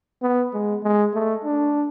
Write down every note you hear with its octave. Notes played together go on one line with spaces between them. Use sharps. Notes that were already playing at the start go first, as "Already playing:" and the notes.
B3
G#3
G#3
A3
D4